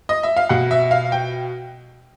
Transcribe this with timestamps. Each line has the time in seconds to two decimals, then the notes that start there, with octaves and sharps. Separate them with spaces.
0.09 D#5
0.23 E5
0.37 F5
0.49 B2 F#5
0.71 E5
0.91 F5
1.12 G5